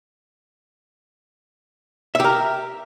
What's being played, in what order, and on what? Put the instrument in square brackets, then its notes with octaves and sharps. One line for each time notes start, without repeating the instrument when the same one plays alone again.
[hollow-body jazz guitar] E5
G4
A#4